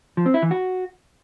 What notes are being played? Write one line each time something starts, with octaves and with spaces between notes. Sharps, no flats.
F3
C4
E4
E3
F#4